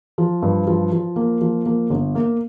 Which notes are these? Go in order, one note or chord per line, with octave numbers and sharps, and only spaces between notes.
F3
G2
F3
F3
A#3
F3
A#3
G1
A#3